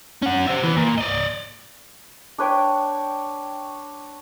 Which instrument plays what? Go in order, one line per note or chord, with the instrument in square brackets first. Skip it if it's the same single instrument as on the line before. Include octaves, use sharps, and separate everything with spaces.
[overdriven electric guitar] C#4 F#5
C5 E5
E3 B3
A#2
D5 D#5
[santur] D4 B4 C#5 G5